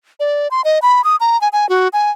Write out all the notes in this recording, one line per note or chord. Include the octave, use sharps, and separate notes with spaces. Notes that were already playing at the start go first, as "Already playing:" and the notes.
D5
C6
D#5
B5
D#6
A#5
G#5
G#5
F#4
G#5